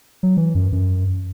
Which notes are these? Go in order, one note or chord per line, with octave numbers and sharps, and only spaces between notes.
F#3
E3
F#2
F#2